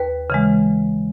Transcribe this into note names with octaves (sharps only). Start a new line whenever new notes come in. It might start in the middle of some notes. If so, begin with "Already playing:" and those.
Already playing: D#2 B4
C#3 E3 G#3